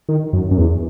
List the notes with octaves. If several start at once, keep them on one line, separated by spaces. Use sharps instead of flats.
D#3
F#2
F#2
E2